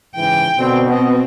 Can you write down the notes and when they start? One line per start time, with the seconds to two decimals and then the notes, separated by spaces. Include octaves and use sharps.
0.16 G#2 C#3 E3 G5
0.57 B2 D3 D#3 C4
0.88 B3 C4 D#5